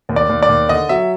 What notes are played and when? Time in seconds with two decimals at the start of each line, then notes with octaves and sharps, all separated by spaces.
0.09 D#2
0.16 D5
0.29 D#2
0.43 D5
0.49 D#2
0.69 D3 D#5
0.89 F#3 E5